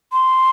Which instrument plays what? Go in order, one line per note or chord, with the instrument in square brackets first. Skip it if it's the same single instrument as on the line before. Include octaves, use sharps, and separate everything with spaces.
[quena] C6